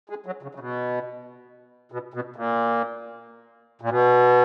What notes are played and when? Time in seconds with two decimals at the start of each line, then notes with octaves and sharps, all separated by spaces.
0.10 G#3
0.26 F#3
0.43 C#3
0.55 C#3
0.60 B2
1.92 B2
2.14 B2
2.36 A#2
3.81 A#2
3.90 B2